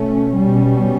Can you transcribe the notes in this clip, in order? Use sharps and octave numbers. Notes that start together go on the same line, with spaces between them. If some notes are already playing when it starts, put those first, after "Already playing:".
Already playing: B2 A3 C#4
B2 G3 C#4